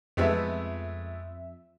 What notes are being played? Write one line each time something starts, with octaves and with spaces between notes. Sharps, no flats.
F2 G#3 A3 B3 E5